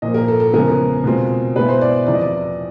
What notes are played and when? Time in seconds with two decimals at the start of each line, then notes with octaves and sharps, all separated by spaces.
0.02 A#2 F3 A#3 D#5
0.14 A#4
0.28 A4
0.40 A4
0.53 E2 C#3 F3 G#3 B3 A#4
1.04 B2 G#3 C4 F4
1.56 B2 G#3 B3 E4 B4
1.68 C5
1.81 D5
2.07 E2 C3 F3 D5
2.14 D#5
2.21 D5